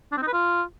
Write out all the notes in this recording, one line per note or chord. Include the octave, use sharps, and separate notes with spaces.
D4
C4
D#4
B4
F4